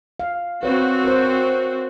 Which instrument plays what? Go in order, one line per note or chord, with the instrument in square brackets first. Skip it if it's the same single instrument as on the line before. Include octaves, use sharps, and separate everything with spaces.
[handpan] F5
[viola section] C4 F#4 [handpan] B4 C#5
[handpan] A#4 C5